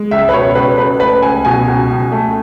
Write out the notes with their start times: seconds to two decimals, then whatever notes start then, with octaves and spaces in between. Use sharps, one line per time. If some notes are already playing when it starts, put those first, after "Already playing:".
Already playing: G#3
0.11 C#2 E5
0.29 B4
0.33 B2 C#5
0.55 C#2 B4
0.78 C#2 B4
1.00 A3 B4
1.23 C#2 G#5
1.45 B2 G#5
1.68 C#2
1.90 C#2
2.12 A3